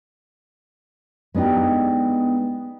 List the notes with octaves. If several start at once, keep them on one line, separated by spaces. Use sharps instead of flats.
G#3 B3 D4 D#4 G4